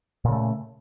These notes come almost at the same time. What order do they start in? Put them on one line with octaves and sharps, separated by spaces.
A#2 C#3 A3